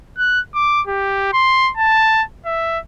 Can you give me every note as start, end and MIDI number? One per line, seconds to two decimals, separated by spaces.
0.18 0.41 90
0.55 0.81 86
0.87 1.30 67
1.33 1.71 84
1.78 2.23 81
2.46 2.79 76